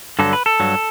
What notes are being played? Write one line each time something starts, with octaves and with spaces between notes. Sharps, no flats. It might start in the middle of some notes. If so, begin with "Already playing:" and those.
G2 D3 F#3 A4
B4
A4
G2 F#3